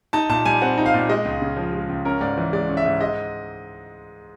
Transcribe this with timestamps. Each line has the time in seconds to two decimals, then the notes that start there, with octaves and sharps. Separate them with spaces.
0.13 D#4 A5
0.29 A#2 A5
0.45 G3 G#5
0.62 C4 F#5
0.78 D#4
0.86 F5
0.94 A#2
1.09 G#3 D#5
1.25 C#2
1.41 C#3
1.57 F3
1.73 G#3
1.89 C#2
2.05 C#4 A#4
2.21 G#2 D5
2.37 E3
2.53 G#3 D5
2.69 C#4
2.77 E5
2.85 G#2
3.01 G#3 D#5